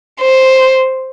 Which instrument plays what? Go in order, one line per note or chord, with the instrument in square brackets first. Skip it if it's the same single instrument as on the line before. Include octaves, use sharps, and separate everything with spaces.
[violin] C5